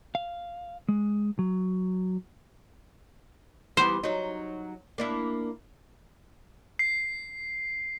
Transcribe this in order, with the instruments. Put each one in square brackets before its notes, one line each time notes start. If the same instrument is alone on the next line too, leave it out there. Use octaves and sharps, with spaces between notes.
[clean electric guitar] F5
G#3
F#3
[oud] E3 G3 B3 [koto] C5
[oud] F#3 D#4
A#3 D4 E4
[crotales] C7